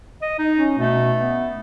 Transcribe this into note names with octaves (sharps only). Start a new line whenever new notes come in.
D#5
D#4
C#4
B2 A3
B3